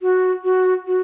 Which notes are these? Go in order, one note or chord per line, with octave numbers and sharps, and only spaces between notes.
F#4
F#4
F#4